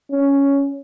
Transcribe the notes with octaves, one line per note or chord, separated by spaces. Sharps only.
C#4